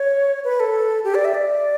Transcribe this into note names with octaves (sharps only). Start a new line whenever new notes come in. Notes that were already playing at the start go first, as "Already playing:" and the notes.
Already playing: C#5
B4
A4
G4
D5
E5
D5